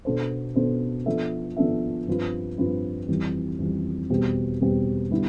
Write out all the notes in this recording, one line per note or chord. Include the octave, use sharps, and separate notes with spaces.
B2 B3 D4 A4 C5
B2 B3 D4 A4 C5
F3 B3 D4 A4 E5
F3 B3 D4 A4 E5
G2 F3 C4 F4 B4
G2 F3 C4 F4 B4
F2 E3 G3
F2 E3 G3
E2 B2 G3 C4 G4
E2 B2 G3 C4 G4
D3 G3 B3 E4